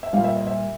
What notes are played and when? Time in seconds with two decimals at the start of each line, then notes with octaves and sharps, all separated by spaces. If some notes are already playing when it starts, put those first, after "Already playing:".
0.03 E5
0.13 A#2 G3 F5
0.24 E5
0.36 D#5
0.47 E5